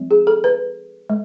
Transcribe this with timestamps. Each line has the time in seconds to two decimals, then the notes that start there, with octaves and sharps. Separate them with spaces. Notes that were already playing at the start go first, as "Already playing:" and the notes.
Already playing: F3 G#3 C4
0.11 G#4
0.27 A4
0.44 B4
1.10 G#3